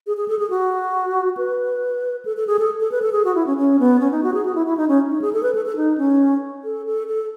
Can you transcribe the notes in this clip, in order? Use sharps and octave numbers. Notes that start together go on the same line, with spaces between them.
G#4
G#4
A4
G#4
F#4
B4
A4
A4
G#4
A4
A4
B4
A4
G#4
F#4
E4
C#4
C#4
B3
C#4
D#4
F#4
G#4
F#4
E4
E4
D#4
C#4
D#4
G#4
A4
B4
A4
A4
D#4
C#4
A4
A4
A4